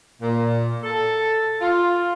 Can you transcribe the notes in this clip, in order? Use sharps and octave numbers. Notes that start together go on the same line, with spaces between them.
A#2
A4
F4